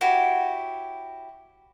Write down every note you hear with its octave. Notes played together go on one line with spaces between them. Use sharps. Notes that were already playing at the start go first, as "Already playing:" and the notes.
E4 F#4 G4 C#5